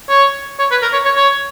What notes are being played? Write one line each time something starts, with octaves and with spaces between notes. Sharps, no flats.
C#5
C#5
B4
A#4
C#5
C#5
C#5